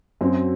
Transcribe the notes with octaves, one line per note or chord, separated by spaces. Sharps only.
F#2 F#3 C4